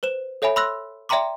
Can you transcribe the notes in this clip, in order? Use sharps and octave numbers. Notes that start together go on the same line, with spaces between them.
B4 C5 E7
A4 C#5 E5 G#5 B5
B5 C6 E6 F#6 A#6
D5 E5 G5 A#5 C6 D6